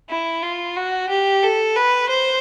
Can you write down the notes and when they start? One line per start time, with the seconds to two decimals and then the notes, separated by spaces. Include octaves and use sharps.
0.09 E4
0.43 F4
0.76 F#4
1.09 G4
1.43 A4
1.76 B4
2.09 C5